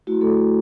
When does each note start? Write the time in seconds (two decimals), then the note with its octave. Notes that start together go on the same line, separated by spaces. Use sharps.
0.07 A3 E4 F#4
0.21 A3 A4